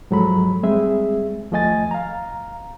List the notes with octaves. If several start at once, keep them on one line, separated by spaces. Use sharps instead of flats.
G#2 F3 F#3 G#3 A4 B5
G3 G#3 C4 G#4 E5
D#2 F3 A3 D#5 G#5 A6
F5 A#5